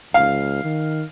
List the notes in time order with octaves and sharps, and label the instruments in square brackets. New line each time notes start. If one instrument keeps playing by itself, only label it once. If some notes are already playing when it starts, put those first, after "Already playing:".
[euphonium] C#2 [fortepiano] F5
[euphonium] D#3